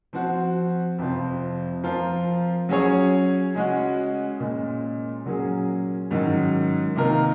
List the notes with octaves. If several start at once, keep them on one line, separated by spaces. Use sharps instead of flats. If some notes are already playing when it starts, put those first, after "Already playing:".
F3 C4 F#4
F2 C3 F3 C4 F4
F3 C4 F4 A#4
F#3 C#4 G#4 C#5
C#3 G#3 C#4 F#4
A#2 G#3 C#4
A#2 F#3 A#3 C#4 G#4
G#2 D#3 F#3 C#4
C3 D#3 A#3 F4 A#4